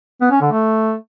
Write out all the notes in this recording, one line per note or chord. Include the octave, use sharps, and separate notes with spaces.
B3
C#4
D3
A3